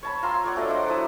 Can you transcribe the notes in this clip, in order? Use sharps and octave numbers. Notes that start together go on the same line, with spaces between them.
C#5 A5 B5
F4 A#5 C6 E6
C#5 D5 F#5
F#3 A3 D4 D#5
C5 D5 F#5
F#3 E4 A5 D#6